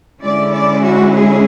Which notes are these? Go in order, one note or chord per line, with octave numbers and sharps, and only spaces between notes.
D3 G#3 C#4 E4 D5
D5
F#4
G#4